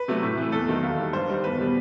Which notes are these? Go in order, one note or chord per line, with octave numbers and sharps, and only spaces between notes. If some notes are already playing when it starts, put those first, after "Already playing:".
Already playing: B4
C3 F#3 A3
A2
E3 A3
E2 A4
D#3 F#3 A3
D#2
D#3 G3
G2 C5
D#3 G3
E2 B4
B2 G3